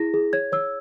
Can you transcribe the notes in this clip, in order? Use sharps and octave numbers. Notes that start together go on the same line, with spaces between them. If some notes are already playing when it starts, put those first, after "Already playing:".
Already playing: E4 G#4 A#6
G#4
C#5 G#6
C#5 E6